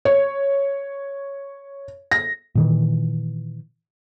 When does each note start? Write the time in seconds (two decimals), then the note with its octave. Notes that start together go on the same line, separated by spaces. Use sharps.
0.05 C#5
2.11 A#6
2.55 A#2 D#3 E3